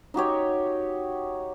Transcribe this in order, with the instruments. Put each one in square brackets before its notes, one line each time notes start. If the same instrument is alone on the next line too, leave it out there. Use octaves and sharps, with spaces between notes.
[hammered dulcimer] D#4 F#4 G4 C#5